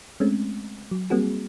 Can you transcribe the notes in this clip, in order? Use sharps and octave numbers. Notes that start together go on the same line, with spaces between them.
G#3 A3 C4 C#4
F#3
G3 A#3 C4 F#4 G#4